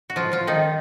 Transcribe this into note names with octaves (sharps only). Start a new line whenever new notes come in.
F#4
F3 F4
F3 F4
D#3 D#4